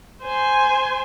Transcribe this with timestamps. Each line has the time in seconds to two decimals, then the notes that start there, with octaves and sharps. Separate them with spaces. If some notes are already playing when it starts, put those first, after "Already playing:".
0.24 C5 G#5